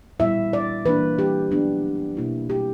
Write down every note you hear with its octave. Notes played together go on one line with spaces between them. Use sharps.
A#2 G3 B3 E4 E5
D5
E3 A#3 D4 B4
G4
F#3 B3 D4
B2 A#3 E4
G4